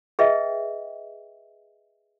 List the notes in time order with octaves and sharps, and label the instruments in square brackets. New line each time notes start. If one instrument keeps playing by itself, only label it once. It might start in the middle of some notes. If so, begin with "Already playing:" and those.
[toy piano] G#4 B4 D#5 E5 G5